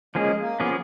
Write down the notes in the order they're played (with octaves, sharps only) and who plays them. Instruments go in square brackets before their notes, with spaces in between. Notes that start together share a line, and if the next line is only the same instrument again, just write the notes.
[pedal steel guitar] F3 A#3 C#4 G#4 [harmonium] G#3
[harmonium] A#3
[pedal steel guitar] F3 A#3 C#4 G#4 [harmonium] B3